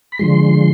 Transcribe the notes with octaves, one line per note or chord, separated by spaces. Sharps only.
B5
D3 F3 G#3 C6